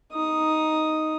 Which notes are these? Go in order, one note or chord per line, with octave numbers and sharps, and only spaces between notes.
D#4 D#6